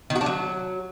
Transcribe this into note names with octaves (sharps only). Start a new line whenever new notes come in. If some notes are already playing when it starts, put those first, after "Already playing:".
D#3
F#4
D4
F#3